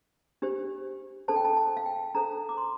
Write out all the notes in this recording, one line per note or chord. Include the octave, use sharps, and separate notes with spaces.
D4 G4 C5
D4 A4 C5 A5
G5
A5
A5
F5
G5
D4 A4 C5 A#5
D6
C6